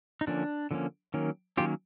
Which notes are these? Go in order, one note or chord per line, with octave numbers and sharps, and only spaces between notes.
D#4
D3 F3 A#3 C#4 D4
D3 F3 A#3 C#4
D#3 F#3 A#3 C#4
D#3 F#3 A#3 C#4 F4 G4